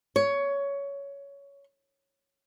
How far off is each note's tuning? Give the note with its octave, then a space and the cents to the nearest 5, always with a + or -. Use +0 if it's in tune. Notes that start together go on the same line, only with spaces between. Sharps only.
C#5 +15